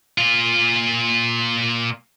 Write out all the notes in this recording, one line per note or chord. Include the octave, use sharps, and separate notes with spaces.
A#2 F4